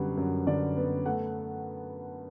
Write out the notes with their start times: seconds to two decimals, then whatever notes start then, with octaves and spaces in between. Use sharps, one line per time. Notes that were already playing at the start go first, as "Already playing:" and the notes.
Already playing: F#2 D3 G3 B3 F#5
0.17 F#2
0.47 D3 D5
0.77 B3
1.06 A3 F#5